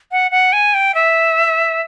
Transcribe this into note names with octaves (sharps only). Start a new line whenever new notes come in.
F#5
F#5
G#5
G5
E5